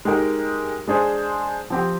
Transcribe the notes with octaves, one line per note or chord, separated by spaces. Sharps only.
G#3 D#4 G4 A#4
G#3 D4 G#4 C5
F3 C4 G4